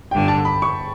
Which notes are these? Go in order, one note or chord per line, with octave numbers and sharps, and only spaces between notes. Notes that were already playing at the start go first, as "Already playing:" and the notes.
G1 G2 D3 G5
A5
B5
C#6